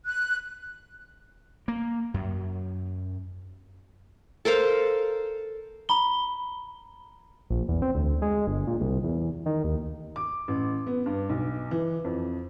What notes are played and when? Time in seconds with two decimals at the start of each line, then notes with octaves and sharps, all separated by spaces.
0.06 F#6
1.68 A#3
2.14 F#2
4.45 A4 A#4 C5 F5
5.89 A#5 B5 G7
7.50 A#1
7.68 E2
7.82 C4
7.95 D2
8.22 G#3
8.47 G1
8.67 A#2
8.81 C2
9.04 E2
9.46 D#3
9.64 D#2
10.16 D6
10.48 A1
10.87 B3
11.06 G2
11.30 B1
11.71 E3
12.04 F2